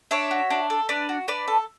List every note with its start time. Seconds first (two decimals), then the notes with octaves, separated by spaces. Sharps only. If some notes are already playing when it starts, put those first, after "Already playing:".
0.11 D4 C#5 E5
0.31 F#4
0.50 D4
0.70 A4
0.89 D4 B4 D5
1.09 F#4
1.28 D4 B4 D5
1.48 A4